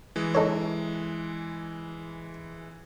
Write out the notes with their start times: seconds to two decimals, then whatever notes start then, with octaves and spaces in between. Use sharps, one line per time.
0.16 E3 G#3
0.35 D#4 A4 C#5